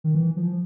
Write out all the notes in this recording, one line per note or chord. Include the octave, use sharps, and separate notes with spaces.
D#3
E3
F3